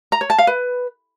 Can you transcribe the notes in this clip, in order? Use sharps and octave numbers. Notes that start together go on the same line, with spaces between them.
A#5
C#5
A5
F5
B4